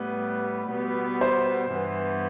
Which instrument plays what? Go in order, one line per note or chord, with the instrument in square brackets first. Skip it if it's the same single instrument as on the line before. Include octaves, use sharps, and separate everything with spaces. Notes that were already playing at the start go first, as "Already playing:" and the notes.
Already playing: [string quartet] A2 G3 B3 [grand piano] B4
[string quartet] B2 G3 B3
[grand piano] C5
[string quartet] G2 E3 B3